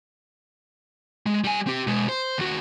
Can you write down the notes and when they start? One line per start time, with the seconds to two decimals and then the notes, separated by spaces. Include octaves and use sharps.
1.26 G#3
1.44 G3 G#5
1.67 C4 G4
1.87 B2 G#3
2.09 C5
2.38 D#2 F#4